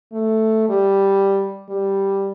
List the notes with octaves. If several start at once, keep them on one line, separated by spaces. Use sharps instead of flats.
A3
G3
G3